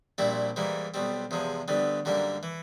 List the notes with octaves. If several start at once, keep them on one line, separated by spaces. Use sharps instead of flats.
A#1 A#2 G3 C4 E4
G#2 E3 G3 A#3
B1 B2 G3 C4
E2 C3 F3 G#3
D2 D3 G3 B3
F#2 D3 G3 A#3
E3